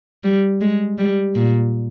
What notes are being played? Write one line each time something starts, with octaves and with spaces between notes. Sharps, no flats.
G3
G#3
G3
A#2